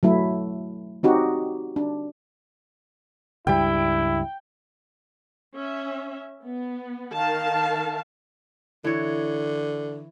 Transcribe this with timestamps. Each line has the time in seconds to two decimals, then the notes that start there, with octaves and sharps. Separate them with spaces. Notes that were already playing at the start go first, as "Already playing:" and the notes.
0.03 F#3 A3 E4
1.03 C4 D#4 F#4 G4
1.76 D4
3.47 C#2 G2 G3 E4 G5
5.55 C#4 E5
6.44 B3
7.13 D#3 A#4 F5 A5
8.84 D3 E3 C#5